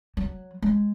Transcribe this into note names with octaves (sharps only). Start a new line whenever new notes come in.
F#3
G#3